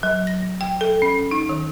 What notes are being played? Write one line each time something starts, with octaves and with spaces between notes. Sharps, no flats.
F#3
A#6
G5
A4
C#4
D#4
D#3